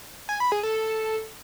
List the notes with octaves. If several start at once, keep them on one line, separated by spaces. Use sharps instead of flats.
G#5
B5
G#4
A4